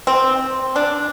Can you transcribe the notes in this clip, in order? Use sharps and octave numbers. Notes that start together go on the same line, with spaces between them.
C4
D4